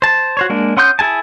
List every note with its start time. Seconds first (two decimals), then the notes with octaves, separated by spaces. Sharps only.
0.02 C5 A5
0.37 F#4 C5 C#5
0.50 G#3 A#3 D4
0.77 C#4 F#5 C6 D#6 G6
0.99 E4 G#4 G#5 A5